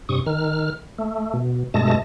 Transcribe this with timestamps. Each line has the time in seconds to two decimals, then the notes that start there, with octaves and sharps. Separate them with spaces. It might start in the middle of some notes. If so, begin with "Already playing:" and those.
0.09 G2 C3 C#6 D#6
0.26 D#3 F6
0.99 A3
1.34 B2
1.74 G2 B2 G#3 A3 A5 A#6